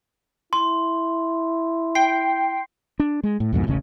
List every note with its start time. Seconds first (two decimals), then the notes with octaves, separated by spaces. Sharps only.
0.53 E4 C6
1.95 G5 C7
3.00 D4
3.23 G#3
3.40 A2
3.53 C2 F2 G#2 B2
3.67 E1 A1 C#3 C#4